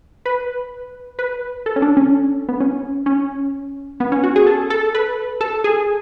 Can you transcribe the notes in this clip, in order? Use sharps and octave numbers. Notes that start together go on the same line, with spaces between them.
B4
B4
A4
C#4
D4
C#4
B3
C#4
C#4
B3
C#4
F#4
G#4
A4
A4
B4
A4
G#4